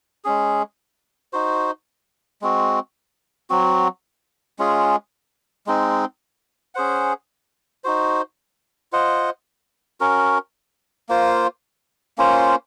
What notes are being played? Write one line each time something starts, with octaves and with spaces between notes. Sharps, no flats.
G#3 C#4 G#4
D#4 F#4 C5
G#3 C4 F#4
F#3 C4 F#4
G#3 C#4 F4 G#4
G#3 C4 D#4
C#4 G#4 C5 F#5
D#4 F#4 C5
F4 C5 D#5 F#5
C#4 F#4 A#4
A#3 F4 C5
A#3 C#4 F4 C5